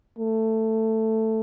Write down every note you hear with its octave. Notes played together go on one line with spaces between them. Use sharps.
A3